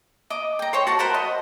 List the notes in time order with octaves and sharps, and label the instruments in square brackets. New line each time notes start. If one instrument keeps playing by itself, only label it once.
[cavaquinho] D#5 D6
G5 A#5
C5 C#5 G5
F#4 A5
A#4 C5 F#5 B5
D#5